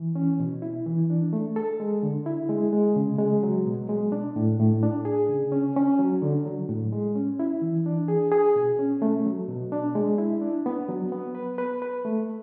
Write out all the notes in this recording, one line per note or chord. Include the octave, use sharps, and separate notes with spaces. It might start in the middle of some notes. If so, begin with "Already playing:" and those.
Already playing: E3
C#4
B2
E4
E3
D4
A3
A4
G#3
D3
E4
G#3
G#3
C#3
G#3
F#3
B2
G#3
D4
A2
A2
D4
G#4
C#3
C#4
C#4
F#3
D3
F#3
A2
G#3
C#4
E4
E3
D4
G#4
G#4
B2
C#4
A3
F#3
B2
D4
G#3
E4
D4
B3
F#3
B3
B4
B4
B4
A3